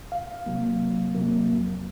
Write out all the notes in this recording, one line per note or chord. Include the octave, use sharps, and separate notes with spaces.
C2 F5
C3 F#3 A#3
C2
C3 F#3 A#3
F2